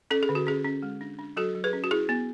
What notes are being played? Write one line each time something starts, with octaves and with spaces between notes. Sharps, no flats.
C#4 A4
G#4
D3
F#4
C#4 G#4
C#4
G#3
D4
D4
F#3 F#4 A4
F#3
G#4 B4
C#4
F#4
E4 G#4
B3